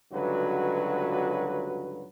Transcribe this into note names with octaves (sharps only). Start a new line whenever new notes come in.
C#2 G2 D3 F#3 F#4 B4